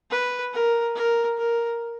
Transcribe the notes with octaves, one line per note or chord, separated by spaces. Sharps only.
B4
A#4
A#4
A#4